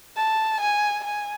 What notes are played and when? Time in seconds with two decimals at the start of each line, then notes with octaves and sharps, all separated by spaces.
0.16 A5
0.61 G#5
1.04 G#5